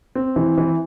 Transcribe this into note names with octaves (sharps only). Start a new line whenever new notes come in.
C4
E3
E3